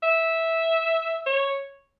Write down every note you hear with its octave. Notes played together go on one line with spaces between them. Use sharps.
E5
C#5